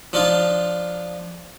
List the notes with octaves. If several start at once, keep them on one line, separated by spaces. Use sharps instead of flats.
F3 D4 D#4 F4